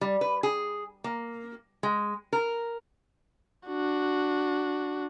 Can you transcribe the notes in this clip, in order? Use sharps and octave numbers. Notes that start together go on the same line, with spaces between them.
G3
B4
G#4
A#3
G#3
A#4
D4 F#4